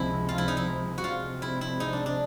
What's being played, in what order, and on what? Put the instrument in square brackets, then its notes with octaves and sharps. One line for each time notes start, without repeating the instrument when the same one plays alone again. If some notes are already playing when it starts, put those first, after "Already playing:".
Already playing: [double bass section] C#2 C3 F3 G#3 C4 [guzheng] E4
[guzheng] F4
E4
D#4
E4
F#4
[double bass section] C3 F3 G#3 C4 [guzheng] F4
[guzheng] E4
E4
D#4
D4
D4